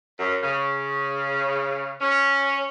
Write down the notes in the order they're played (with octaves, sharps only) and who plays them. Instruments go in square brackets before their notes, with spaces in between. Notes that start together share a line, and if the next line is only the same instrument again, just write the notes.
[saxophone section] F#2
C#3
C#4